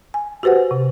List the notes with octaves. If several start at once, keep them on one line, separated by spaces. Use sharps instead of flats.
G#5
F#4 G4 B4 C5 F#5
C3